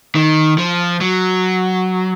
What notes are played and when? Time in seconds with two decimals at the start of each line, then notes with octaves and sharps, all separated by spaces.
0.15 D#3
0.58 F3
1.01 F#3